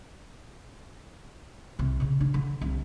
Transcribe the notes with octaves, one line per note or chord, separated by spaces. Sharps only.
C2 C3
A#2 C#3
D4
D3
C2